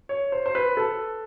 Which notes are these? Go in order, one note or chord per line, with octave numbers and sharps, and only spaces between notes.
C#5
C5
C5
B4
A4